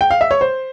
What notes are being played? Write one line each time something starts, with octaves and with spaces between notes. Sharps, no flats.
G5
F5
E5
C#5
C5